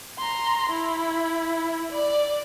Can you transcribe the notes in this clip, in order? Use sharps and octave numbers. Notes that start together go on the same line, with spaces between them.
A#5 C6
E4
D5